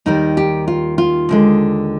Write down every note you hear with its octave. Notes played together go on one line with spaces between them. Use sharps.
D#2 D#3 G3 D#4
G4
F4
F4
D#2 D3 G#3